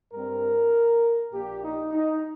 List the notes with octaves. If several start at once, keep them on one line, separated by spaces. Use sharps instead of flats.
G2 G3 C4 A#4
A#1 A#2 A#3 G4
D#4
D#4